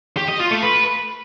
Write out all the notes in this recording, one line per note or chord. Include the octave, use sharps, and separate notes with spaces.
G4
D#5
F4
A3
B4